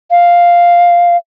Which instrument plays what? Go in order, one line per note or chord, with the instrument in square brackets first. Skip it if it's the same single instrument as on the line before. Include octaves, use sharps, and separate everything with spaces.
[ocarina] F5